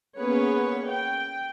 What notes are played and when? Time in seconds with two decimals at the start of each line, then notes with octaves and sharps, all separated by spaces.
0.20 A#3 B3 C#4 G#4 B4 C#5
0.87 G5